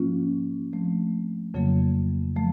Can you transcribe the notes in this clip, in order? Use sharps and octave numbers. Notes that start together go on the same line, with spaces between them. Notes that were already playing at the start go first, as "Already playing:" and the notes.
Already playing: G#2 F3 A#3 C#4 F4
F3 A3 C4
F2 C#3 F#3 A#3
F3 A3